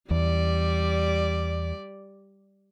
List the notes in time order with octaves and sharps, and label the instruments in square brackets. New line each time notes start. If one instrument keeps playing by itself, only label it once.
[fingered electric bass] E2 [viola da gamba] G3 D5